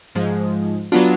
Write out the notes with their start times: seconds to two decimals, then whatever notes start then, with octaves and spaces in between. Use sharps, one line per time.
0.15 G#2 F3 G#3
0.92 F#3 B3 D4 F4